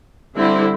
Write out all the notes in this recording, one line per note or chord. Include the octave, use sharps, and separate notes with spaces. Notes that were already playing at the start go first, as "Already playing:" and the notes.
D3 G3 C4 E4